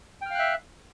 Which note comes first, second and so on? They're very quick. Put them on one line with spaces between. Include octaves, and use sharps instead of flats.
G5 F6 F5 F#6 E5